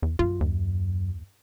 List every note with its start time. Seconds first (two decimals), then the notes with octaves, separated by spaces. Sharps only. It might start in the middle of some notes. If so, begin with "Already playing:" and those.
0.02 E2
0.19 F#2 F4
0.41 D#2